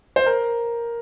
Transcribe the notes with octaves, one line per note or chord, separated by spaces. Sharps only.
C5
A#4